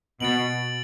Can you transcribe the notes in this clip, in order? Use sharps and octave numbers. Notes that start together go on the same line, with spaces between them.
B2 A6 D7 F#7